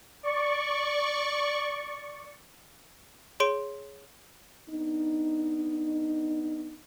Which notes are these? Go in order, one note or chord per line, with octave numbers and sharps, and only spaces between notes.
D5 C#6
G#4 C#5 C6 D7
B3 D4 D#4